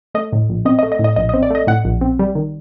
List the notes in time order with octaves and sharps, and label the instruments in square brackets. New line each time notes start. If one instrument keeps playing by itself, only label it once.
[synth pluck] A3 D#5
A2
A#1
C4 D#5
D#5
A3
D#5
A2
D#5
A#1 D#5
D#5
C4
D5
A3 D#5
A2 F#5
A#1
C4
G3
D#3